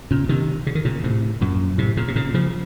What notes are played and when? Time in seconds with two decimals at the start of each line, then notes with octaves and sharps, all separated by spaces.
0.11 A#2 C#3
0.29 C3 D#3
0.67 C#3
0.75 D#3
0.85 A#2 C#3
1.04 A2 C3
1.41 F#2 A#2
1.78 A2 C3
1.97 A#2 C#3
2.08 C3
2.16 A#2 C#3
2.34 C#3 F3